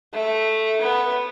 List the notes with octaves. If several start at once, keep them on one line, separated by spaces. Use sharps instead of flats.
A3
B3